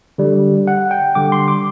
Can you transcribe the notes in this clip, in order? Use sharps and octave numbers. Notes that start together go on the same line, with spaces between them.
D3 G3
F#5
G5
D3 G3 D6
C6
D6